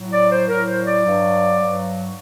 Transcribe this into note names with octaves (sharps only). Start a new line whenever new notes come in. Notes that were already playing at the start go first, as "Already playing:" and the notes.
Already playing: A2 F#3
D5
C5
A2 F#3 A#4
C5
D5
G2 F#3
G2 F#3